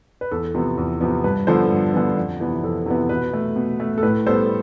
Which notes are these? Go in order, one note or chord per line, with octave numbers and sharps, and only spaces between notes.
B4
E2 A4
C3 F3 B3
E2
C3 F3 B3
G2 B4
D3 F3 B3 A4 C5
G2
D3 F3 B3
F2
C3 E3 B3
F2 A4
C3 E3 B3
B2 B4
A3
B2
A3
A4
A2 B4
G3 B3 A4 C5